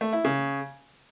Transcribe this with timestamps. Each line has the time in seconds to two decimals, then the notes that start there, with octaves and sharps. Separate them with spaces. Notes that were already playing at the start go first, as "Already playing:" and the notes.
0.01 A3
0.13 E4
0.24 C#3